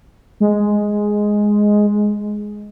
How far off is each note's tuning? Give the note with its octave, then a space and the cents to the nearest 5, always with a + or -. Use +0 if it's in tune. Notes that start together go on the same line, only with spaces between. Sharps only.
G#3 +0